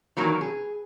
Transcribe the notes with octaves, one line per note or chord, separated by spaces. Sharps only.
D#3 E3 F#3 A#3
G#4